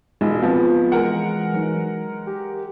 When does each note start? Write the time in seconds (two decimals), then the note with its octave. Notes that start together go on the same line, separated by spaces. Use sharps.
0.21 E1 G#3 D#4 F4 G#4
0.42 F3 B3 C4
0.92 E3 G#3 A#4 F#5
1.54 F#3 D#4
2.27 G4